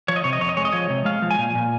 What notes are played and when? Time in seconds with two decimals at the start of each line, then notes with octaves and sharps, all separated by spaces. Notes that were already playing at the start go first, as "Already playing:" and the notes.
0.08 F3 C#5
0.16 D#5
0.24 C3 C#5
0.33 D#5
0.41 F2 C#5
0.49 D#5
0.57 G#3 C#5
0.65 D#5
0.72 F3 C#5
0.90 C3
1.05 G#3 F5
1.22 F3
1.31 G#5
1.38 A#2
1.55 A#2